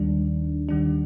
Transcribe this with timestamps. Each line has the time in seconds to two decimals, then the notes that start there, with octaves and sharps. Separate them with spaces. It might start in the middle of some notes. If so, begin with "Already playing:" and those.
Already playing: D#2 D#3 G3 D4
0.69 D#2 D#3 G3 D4